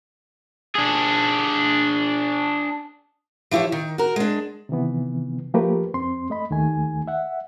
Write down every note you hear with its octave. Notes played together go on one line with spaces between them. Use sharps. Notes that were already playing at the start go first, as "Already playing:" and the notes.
D4 G#4
E3 F3 E4 G4 C#5
D#3
F#4 A#4
G#3 D4
C3 D#3 E3 B3
F3 A3 A#3 G4 A#4 B4
F2 C4 C6
A3 D#5 B5
D#2 D#3 A3 G#5
E5 F#5